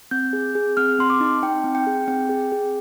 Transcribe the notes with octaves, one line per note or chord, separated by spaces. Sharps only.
C4 G6
G#4
G#4
C4 F6
C4 C6
D6
D#4
D#4 G5
C4
G5
G#4
C4 G5
G#4
G#4